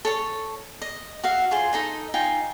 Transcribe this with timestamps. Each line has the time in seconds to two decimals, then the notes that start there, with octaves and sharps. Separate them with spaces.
0.05 A4 C#5 A5
0.82 D#5
1.24 F#4 E5 F5
1.51 F4 G#4 C5 C6
1.73 D#4 A4 D#5
2.14 D#4 F4 G5 G#5